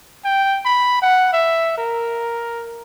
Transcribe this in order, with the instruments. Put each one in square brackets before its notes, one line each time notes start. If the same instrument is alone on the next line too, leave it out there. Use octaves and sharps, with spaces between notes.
[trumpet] G5
B5
F#5
E5
A#4